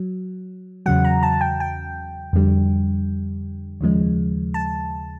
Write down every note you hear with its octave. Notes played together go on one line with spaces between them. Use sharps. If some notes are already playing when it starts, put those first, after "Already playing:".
Already playing: F#3
E2 C#3 F#3 F#5
A#5
A5
G5
G5
F2 D3 G3
D#2 C#3 F3 G#3
A5